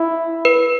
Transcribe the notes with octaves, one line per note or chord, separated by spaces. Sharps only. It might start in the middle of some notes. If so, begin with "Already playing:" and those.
Already playing: E4
B4